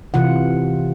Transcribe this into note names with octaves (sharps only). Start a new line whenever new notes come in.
C3 E3 F4 F#5